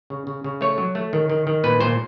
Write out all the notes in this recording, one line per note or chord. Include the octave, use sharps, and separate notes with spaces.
C#3
C#3
C#3
A3 C#5
F#3
A3
D#3
D#3
D#3
A#2 B4
A#2 C5